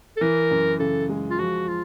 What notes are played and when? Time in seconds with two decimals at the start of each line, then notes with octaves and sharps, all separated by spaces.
0.17 A4
0.21 E3 A#4
0.51 F#2
0.79 C#3 A4
1.09 G#3
1.30 F4
1.39 F3 F#4
1.68 F4